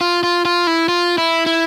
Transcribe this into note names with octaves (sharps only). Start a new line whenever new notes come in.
F4
F4
F4
E4
F4
E4
E4